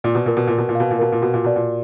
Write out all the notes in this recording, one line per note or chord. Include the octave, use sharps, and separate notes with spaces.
A#2 D5
B2
A#2 A#4
B2
A#2 A#4
B2
A#2
B2 F5
A#2
B2 A#4
A#2
B2 F#4
A#2
B2 D5
A#2